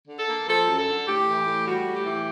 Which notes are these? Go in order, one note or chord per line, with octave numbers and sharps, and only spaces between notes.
D3
A4
A#3
F3 A4
F#2
A4
D3
A2 G4
E3
A2
G3 F#4
A2
G4
E3